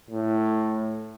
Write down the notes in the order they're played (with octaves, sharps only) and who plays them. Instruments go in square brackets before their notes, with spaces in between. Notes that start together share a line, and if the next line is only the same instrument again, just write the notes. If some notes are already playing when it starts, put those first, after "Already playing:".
[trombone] A2